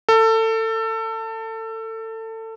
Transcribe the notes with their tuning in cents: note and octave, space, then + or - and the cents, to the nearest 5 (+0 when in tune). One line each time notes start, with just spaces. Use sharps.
A4 +25